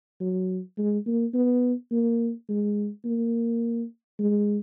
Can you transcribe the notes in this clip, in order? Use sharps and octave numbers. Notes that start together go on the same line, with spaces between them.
F#3
G#3
A#3
B3
A#3
G#3
A#3
G#3